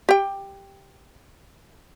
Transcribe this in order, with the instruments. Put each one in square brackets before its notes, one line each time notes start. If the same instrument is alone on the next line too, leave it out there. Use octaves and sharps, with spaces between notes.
[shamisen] G4 G5